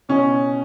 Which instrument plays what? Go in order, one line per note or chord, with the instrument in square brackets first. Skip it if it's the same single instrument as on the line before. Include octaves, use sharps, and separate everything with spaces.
[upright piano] B2 C#4